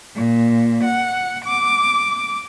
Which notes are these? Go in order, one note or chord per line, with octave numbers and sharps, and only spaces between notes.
A#2
F#5
D6